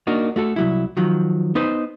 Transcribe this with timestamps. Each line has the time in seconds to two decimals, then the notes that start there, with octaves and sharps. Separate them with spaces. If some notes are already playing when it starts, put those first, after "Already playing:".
0.07 A#3 D4 D#4 F#4
0.36 A3 F#4 A4
0.56 C2 F#3 E4
0.97 D#3 F3 F#3
1.55 B3 D#4 B4 C5